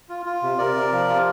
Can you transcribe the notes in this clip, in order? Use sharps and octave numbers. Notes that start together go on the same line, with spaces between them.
F4
F4
C3
C3 A#4 D5
C3
F3
F4